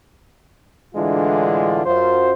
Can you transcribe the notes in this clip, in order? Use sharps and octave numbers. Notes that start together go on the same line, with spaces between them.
A2 D3 E3 G#3 D4 F4
F#2 F4 C5